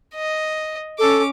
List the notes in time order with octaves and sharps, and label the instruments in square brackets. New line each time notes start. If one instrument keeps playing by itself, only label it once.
[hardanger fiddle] D#5
[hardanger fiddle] C#4 D6 [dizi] A4